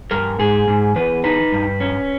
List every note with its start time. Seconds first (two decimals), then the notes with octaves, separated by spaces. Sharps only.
0.11 G2 A#4
0.39 G#2 G#4
0.68 G#2
0.96 E2 B4
1.24 D#4 B4
1.52 G2
1.80 C#4